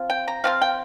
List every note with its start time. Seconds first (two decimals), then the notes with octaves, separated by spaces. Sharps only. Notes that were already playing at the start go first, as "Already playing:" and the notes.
Already playing: F3 C4 F4
0.10 G5
0.28 A#5
0.44 F3 C4 F4 F5
0.62 G5